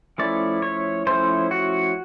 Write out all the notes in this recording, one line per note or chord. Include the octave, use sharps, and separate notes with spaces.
F3 A3 C#4 E4 D5
C#5
F3 A3 C#4 E4 C5
F#4